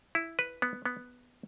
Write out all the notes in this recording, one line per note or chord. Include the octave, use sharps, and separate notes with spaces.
E4
B4
B3
B3